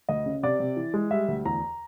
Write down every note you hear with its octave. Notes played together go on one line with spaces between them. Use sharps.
D2 D#5
C#3
C3 D5
C3
E3
G#3
G3 E5
D2
E2 A#5